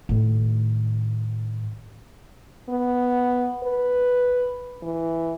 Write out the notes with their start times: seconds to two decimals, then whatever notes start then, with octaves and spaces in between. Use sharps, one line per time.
0.09 A2 D#3
2.69 B3
3.63 B4
4.83 E3